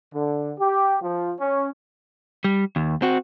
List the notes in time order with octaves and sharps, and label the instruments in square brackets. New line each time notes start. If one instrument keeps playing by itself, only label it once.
[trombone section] D3
G4
F3
C#4
[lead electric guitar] G3
D#2
C4 F#4